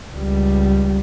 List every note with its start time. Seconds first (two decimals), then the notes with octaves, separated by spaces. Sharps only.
0.13 C#2 G3